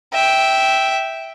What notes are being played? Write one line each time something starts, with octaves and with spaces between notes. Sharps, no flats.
E5 G5